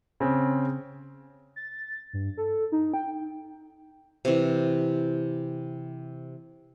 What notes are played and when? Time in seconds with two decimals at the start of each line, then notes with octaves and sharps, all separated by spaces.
0.20 C#3 C4
1.56 A6
2.13 G2
2.37 A4
2.72 D#4
2.94 G5
4.25 C3 E3